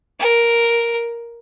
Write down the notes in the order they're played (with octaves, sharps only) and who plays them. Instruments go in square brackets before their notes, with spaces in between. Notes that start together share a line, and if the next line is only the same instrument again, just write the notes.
[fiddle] A#4